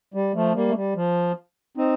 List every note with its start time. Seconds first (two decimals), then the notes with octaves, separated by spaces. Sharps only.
0.14 G3
0.34 F3 A3
0.54 G3 A#3
0.69 A3
0.75 G3
0.95 F3
1.77 C4 D#4